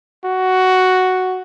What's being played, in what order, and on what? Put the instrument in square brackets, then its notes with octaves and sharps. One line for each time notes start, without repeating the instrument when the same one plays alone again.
[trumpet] F#4